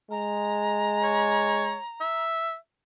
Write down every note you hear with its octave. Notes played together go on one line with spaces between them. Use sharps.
G#3 A#5
C#5
E5